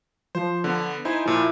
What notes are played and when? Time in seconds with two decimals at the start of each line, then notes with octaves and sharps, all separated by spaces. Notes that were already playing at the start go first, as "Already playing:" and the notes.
0.35 F3 C5
0.64 D3 B3
1.05 D#4 E4 C5 G#5
1.26 A#2 F3 E4